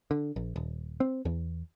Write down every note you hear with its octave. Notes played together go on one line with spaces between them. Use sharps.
D3
A#1
D#1
C4
E2